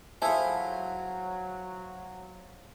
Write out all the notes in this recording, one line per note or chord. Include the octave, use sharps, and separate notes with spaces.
F#3 E4 F4 G#4 A4 C5 E5